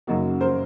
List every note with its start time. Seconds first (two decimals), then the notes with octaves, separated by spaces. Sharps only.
0.07 F#2 C#3 F#3 A#3 D#4 F#4
0.41 A#4 C5